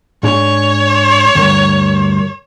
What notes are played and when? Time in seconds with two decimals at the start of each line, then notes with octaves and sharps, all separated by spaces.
0.23 G#2 D4 G#4 C#5
1.35 D2 G2 A#4